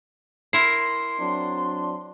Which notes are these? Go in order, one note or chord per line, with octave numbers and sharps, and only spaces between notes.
E4 A#4 C6 C7
F#3 C4 D4